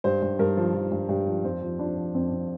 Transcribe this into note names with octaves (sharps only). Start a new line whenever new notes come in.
G2 C5
G2
G2 A#4
F3
F3
G2
G2
F3
F2 C4
F3
F3 D4
F3
F2 C4
F2